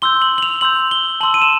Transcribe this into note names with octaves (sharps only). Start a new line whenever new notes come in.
C6 E6 G6 G7
F#7
F#7
F7
C6 E6 G6 F#7
G7
A5 C6 E6 F#7
D#7
E7